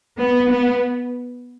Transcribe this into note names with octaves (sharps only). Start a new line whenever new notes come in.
B3
B3